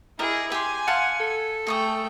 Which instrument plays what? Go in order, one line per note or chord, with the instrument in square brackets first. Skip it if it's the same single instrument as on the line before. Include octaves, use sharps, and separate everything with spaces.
[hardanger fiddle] E4 G#4 [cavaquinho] A#4 D5 D#5
[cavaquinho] G4 C6 [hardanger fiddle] G#5
[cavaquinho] F5 A5 C6 [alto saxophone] F#5
[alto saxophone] A4
[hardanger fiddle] A3 G5 [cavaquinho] G#4 C#6 D#6